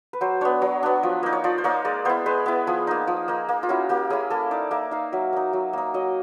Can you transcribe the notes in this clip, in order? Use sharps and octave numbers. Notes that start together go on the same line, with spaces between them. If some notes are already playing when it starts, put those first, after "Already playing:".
B4
F#3 C5
B3 D4 C#5
F#3
B3 D4
F3
A#3 D#4
C#5
F3 D5
C5
A#3 D#4 C#5
G#3 D5
B3 E4 C5
G#3 B4
B3 E4
F3 G#4
A#3 D#4
F3
A#3 D#4
A#3
F4
C#4 E4 F#4
A#3 G4
C#4 E4 G#4
A#3 A4
D#4 D5
A#3 E5
D#4 F5
F#3 E5
A#3 D#4
F#3
A#3 D#4
F#3 D#5